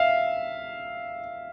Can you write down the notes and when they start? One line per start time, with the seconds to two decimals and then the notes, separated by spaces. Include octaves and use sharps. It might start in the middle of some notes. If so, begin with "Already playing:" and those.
Already playing: E5 F5